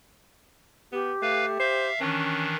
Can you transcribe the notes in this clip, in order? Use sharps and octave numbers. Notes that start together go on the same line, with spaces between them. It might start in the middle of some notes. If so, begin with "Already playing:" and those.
B3 G4
A3 B4 F5
C5 E5 F5
D#3 E3 C#4 D4 C#6